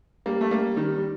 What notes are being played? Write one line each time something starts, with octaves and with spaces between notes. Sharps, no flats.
G3 A#3
A3
G3 A#3
D#3 G3
G3